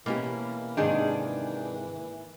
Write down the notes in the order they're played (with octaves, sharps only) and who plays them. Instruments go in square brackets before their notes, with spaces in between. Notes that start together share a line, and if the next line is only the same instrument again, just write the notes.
[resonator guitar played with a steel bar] B2 [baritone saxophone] E3 [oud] A#3 C#4 G4
[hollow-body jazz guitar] G#2 C3 D#3 [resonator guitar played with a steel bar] D4 D#4 G#4